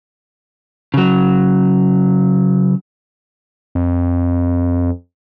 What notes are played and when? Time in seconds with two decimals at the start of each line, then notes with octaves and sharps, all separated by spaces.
0.94 C#3 F#3
3.75 F2